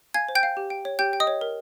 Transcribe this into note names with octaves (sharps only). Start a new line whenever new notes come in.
F5 G#5 G#6
C5
G5 G6
F5
G4
G5
C#5
G4 G5 G6
G5
D#5 D#6
C#5
A#4